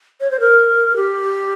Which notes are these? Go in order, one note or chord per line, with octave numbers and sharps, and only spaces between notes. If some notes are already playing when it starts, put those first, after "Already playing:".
C#5
C5
A#4
G4